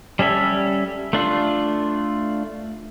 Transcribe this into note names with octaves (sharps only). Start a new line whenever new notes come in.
G3 C#4 A4 E5
A3 D4 F4